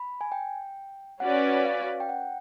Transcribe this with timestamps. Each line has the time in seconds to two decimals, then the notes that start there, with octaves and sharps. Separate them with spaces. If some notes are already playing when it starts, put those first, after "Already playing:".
Already playing: B5
0.21 G#5
0.32 G5
1.20 C#4 F#4 B4 D5 F#5
1.65 F5
2.00 G5
2.09 F#5